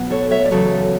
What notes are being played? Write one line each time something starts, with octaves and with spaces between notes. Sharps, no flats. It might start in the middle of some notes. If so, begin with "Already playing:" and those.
Already playing: B2 F#3 B3
A4 C#5
C#5 E5
D5
E2 C#3 F#3 A4 C#5